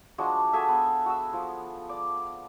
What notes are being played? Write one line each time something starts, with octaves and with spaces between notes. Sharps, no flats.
F3 G#3 D4 F#4
F#4 G#4 A4 E5
B3
F#4 E6
F3
D5